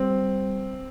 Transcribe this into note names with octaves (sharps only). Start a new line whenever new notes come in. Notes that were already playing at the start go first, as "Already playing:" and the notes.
Already playing: G3 C4